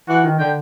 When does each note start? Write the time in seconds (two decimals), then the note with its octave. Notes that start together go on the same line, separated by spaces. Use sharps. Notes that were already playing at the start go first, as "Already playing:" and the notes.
0.09 E3 F#5
0.24 D#3
0.39 D3 G5